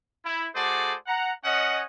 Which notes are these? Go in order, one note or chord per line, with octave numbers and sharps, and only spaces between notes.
E4
A3 F#4 G#4 A4 C5 D5
F#5 A#5
C#4 D#5 F#5